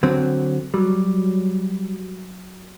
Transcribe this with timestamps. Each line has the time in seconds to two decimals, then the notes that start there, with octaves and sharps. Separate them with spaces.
0.03 D3 F#3 C4
0.74 F#3 G3